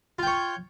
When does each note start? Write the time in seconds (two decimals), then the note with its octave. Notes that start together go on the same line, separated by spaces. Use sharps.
0.19 F4
0.23 G5
0.27 C#5